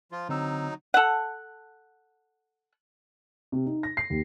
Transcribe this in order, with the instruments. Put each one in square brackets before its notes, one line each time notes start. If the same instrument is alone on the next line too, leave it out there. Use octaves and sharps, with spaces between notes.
[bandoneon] F3 F4
[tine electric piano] D3 C4 E6 [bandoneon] F#3 D#4
[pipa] A4 F#5
[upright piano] C3
D#4
A#6
C7
D#2